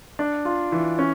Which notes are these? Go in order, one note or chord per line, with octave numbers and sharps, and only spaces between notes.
D4
F4
E3
C#4